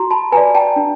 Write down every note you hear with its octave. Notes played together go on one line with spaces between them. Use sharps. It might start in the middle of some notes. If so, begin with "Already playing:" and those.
Already playing: F#4 A#5 C6
A5 B5
B4 D5 G#5 A#5
G5 A5
D4